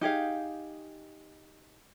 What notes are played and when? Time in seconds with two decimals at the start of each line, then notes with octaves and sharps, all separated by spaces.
0.01 D#4 G4 G#4 F5